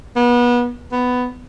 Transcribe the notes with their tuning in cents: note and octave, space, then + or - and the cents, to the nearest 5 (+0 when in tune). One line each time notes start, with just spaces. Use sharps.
B3 -30
B3 +10